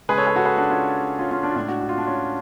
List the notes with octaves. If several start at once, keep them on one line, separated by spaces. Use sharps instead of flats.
C#3 G#3 G#4 B4
A4 C#5
G#4 B4
F#4 A4
G#4 B4
D4 F#4
C#4 F4
C#4 F4
C#4 F4
D4
F4
A2 G#3 D4
D4 F#4
F#4
F4
D4
C#4 F4